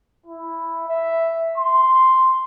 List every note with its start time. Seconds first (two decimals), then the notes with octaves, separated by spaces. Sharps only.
0.26 E4
0.88 E5
1.58 C6